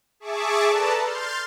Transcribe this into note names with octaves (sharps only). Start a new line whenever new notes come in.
G#4 E5 A5 C#6 D6
A4 B4 D5 A5 A#5
C6 F6 G6 A6